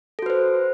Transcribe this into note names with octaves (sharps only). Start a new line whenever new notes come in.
F#4 A4 B4 C5